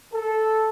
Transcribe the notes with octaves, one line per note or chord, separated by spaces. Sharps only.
A4